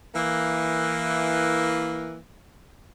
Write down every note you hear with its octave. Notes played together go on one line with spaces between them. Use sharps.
E3 A#3